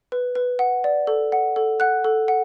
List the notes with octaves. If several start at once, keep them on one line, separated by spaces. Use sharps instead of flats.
B4
B4
F#5
D5
A4
F#5
A4
F#5 F#6
A4
F#5